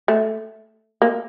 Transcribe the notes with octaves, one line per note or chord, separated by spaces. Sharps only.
A3
A#3